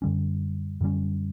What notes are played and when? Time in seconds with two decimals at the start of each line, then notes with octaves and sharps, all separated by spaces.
0.02 F#2 D3 G3 C#4
0.81 F#2 D3 G3 C#4